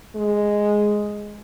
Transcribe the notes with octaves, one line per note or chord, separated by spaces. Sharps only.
G#3